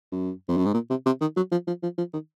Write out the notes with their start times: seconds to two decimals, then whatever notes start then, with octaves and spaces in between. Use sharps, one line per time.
0.12 F#2
0.48 F2
0.57 F#2
0.66 G#2
0.74 A#2
0.90 C3
1.06 C3
1.21 D#3
1.37 F#3
1.52 F3
1.67 F3
1.83 F3
1.98 F3
2.13 D#3